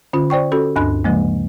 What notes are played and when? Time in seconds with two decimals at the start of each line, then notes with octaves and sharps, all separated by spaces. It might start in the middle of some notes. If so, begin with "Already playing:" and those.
0.13 D3 C#4 F4
0.30 C5 D5 G5 C#6
0.52 C#4 F#4 A4
0.76 D2 G2 D4 B5 F#6
1.04 C#3 F3 G#3 A#3